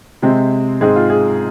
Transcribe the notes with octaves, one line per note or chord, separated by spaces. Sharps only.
C3 G#3 C4
G#2 G#3 C4 G#4
F4
G#4